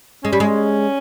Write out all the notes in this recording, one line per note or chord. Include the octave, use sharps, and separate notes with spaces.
G#3 C#4
G3
G#3